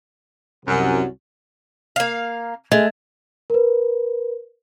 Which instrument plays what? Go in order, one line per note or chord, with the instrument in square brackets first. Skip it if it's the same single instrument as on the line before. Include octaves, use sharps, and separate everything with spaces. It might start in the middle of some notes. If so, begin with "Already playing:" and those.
[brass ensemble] C2 C3 F#3 [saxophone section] F#2
[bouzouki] A#3 F5
[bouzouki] G#3 [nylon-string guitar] A3 [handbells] D#5
[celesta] A#4 B4